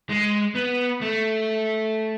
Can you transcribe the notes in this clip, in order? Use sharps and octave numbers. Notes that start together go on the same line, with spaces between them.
G#3
B3
A3